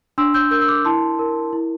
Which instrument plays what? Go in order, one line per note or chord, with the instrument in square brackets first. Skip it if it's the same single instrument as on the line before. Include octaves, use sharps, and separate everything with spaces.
[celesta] D4 C6 E6
E6 G6
A#4 E6 G6
E6
D6 F6
E4 A5 C6
A#4
E4